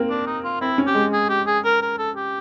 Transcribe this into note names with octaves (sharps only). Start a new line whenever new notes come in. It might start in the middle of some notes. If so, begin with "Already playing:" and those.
Already playing: A#3 C4
D4
D#4
F4
C4 E4
C#4
G4
G#3
G#4
G4
G#4
A#4
A#4
A4
G4